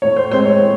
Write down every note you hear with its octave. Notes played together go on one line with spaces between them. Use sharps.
A2 C#5
C5
G#3 C4 C5
C#5
A2